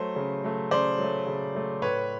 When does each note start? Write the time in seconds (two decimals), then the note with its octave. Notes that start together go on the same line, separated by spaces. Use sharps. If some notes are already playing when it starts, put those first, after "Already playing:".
Already playing: F#3 A3 C5
0.16 C#3
0.44 F#3 A3
0.71 C#3 C5 D5
0.98 F#3
1.03 A3
1.27 C#3
1.55 F#3 A3
1.82 A2 B4 C#5